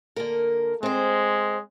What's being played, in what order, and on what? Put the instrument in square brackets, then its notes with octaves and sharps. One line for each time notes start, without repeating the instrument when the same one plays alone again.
[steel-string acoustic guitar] D3 A#3 A#4
[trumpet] G#3 [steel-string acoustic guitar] C4 C5